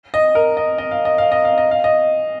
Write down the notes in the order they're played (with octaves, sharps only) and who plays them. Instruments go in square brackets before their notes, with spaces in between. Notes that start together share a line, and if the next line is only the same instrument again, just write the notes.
[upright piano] D#5
A#4
D#5
D#5
F5
D#5
F5
D#5
F5
D#5
F5
D#5